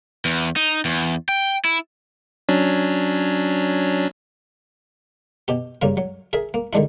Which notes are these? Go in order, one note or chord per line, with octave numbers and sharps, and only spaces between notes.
E2
D#4
E2
G5
E4
F#3 C#4 D4
B2 G4
G2 C#3 A#3 A#4
F#3
G#4 A#4 E5
A#3
D3 D#3 G#3 D4 E4